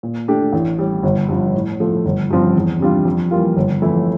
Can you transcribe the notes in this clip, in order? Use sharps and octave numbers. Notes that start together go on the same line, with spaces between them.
A#2
A3 D4 G4
A1
A2 G3
G1
G2 F3
A2
F3 A3
G1
G2 F3 C4
E2
C3 G3 D4 F4
F2
E3 G3 A#3 F4
G1
F2 E3 A3 E4